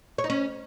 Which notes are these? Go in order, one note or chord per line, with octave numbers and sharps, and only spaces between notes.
C#5
D#4
C#4